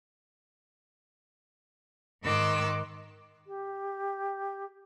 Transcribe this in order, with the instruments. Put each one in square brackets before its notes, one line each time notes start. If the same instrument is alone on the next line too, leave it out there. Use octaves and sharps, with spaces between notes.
[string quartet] G#2 D#3 C6 D6 E6 F#6
[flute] G4